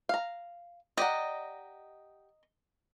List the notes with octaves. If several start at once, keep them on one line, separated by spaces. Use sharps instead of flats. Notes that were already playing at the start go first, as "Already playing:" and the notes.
F5 A#5
G4 D5 D#5 F#5 A#5